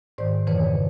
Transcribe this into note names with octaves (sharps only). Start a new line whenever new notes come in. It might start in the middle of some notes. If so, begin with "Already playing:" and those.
G#2 D#3 C5 D5
F2 C#3 E3 B4 C#5